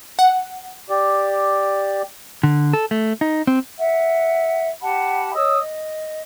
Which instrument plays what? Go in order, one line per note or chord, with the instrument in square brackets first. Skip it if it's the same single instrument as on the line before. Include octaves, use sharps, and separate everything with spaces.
[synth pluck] F#5
[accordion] G4 D5
[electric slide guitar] D3
A4
A3
D#4
C4
[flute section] E5 F#5
G4 F#5 A5 B5
C#5 D#5 D#6 E6
D#5